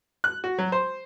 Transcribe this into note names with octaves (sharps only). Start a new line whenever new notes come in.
F#6
F#4
F#3
C5